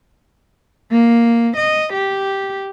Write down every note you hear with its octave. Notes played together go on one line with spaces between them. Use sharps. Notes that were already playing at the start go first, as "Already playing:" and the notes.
A#3
D#5
G4